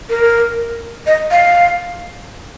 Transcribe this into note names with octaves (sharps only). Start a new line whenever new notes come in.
A#4
D#5
F5